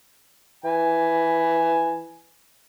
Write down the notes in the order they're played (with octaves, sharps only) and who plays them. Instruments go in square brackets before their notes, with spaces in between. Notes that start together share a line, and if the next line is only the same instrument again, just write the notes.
[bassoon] E3 [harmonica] G#5 B5